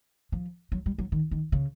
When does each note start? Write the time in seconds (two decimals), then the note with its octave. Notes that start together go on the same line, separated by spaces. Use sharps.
0.32 F3
0.72 F#3
0.86 G3
0.98 F#3
1.12 D#3
1.31 D#3
1.52 C#3